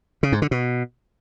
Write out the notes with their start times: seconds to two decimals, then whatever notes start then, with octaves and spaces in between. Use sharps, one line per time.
0.23 C#3
0.32 G#2
0.42 D3
0.51 B2